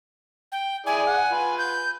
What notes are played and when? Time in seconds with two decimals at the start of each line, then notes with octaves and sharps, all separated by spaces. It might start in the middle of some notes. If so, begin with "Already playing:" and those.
0.52 G5
0.86 E4 G#4 D5 G#5
1.07 F#5
1.31 F4 B4
1.58 G6